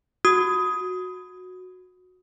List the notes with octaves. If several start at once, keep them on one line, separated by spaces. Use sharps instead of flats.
F#4 D#6